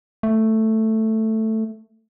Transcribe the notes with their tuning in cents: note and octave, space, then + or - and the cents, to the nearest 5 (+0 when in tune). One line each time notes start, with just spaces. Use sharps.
A3 +5